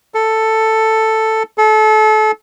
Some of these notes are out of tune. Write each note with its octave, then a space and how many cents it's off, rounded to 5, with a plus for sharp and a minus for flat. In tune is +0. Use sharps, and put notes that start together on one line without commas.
A4 +5
A4 -30